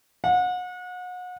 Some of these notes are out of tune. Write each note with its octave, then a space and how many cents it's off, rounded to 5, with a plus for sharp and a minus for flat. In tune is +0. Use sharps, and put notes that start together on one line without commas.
F#5 -35